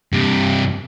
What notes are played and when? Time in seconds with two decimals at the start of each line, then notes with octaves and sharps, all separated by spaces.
0.13 G2 C3